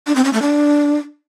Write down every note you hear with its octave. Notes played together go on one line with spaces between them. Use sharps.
D4
C4
C#4
A3
D4